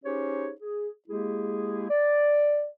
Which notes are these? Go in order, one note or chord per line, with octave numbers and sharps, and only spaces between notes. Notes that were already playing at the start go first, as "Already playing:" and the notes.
C#4 D#4 G4 G#4 C5 C#5
G#4
G#3 A#3 E4 G4 G#4
D5